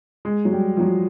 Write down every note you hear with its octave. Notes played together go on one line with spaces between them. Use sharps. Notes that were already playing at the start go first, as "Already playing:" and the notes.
G#3
F#3
G3
F3
F#3